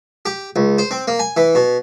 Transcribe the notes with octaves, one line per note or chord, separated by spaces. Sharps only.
G4
C#2
C5
C4
A#3
G#5
E3
B2